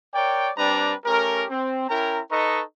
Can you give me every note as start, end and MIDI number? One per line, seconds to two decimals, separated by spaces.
0.15 0.50 70
0.15 0.50 73
0.15 0.50 74
0.15 0.50 79
0.58 0.94 55
0.58 0.94 60
0.58 0.94 62
0.58 0.94 71
0.58 0.94 74
0.58 0.94 82
1.05 1.46 57
1.05 1.46 61
1.05 1.46 67
1.05 1.46 70
1.51 1.88 60
1.89 2.21 61
1.89 2.21 64
1.89 2.21 70
1.89 2.21 79
1.89 2.21 82
2.31 2.63 63
2.31 2.63 69
2.31 2.63 71
2.31 2.63 75
2.31 2.63 82
2.31 2.63 85